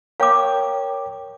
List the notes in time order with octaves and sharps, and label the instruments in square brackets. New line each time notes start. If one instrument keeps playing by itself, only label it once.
[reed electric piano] A#4 C#5 G5 [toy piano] F5 D6